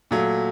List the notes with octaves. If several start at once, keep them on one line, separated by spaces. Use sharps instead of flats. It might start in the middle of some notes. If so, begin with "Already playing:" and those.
A#2 F#3 A3